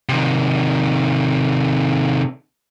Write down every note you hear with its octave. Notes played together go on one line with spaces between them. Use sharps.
C3 D#3